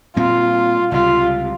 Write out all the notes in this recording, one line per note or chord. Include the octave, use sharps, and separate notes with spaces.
A#2 G3 C4 F4
C#2 C3 G3 F4